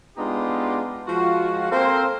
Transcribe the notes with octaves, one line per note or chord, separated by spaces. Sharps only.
G#3 B3 D4 D#4 F4 G4
F3 G#3 F4 F#4
A#3 C4 A4 A#4 C5